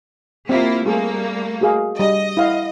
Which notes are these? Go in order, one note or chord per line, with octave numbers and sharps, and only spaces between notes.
A#3 C4 E4 F4
G3 A3 A#3 F4 G#4
F#4 G#4 F5
G3 D#5
E4 F5 F#5